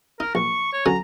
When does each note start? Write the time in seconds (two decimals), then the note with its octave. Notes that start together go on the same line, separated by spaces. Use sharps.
0.20 D#4 A#4
0.35 A#1 C#6
0.73 C#5
0.86 D3 F#3 C#4 A#5